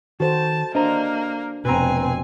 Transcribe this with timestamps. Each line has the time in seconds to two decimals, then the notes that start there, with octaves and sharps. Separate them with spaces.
0.20 D#3 F#4 A4 C5 A5
0.75 A#3 D4 C5 D#5 A#5
1.65 F1 B2 C4 B4 G#5 A#5